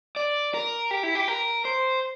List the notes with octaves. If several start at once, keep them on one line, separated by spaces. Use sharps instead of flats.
D5
A#4
G4
E4
G4
A#4
C5